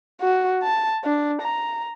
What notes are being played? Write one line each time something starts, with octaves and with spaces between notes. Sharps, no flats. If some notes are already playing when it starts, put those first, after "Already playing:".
F#4
A5
D4
A#5